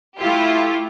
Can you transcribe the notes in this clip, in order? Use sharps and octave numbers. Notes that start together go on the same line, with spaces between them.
A3 E4 F4 G4